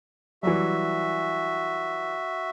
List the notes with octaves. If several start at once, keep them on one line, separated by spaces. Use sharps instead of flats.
E3 F#3 G3 F#4 E5